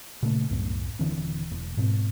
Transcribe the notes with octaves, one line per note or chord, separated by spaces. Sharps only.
A#2 C#3 A3
C2 F#2 A2 B3
D#1 D3 E3 C4
E1
G#2 B2 B3 C4